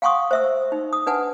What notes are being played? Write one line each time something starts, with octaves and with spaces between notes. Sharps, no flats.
F5 F#5 G#5 C6 C#6 D#6
C5 E5 E6
D#4
D#6
D4 B4 F#5 G#5 A5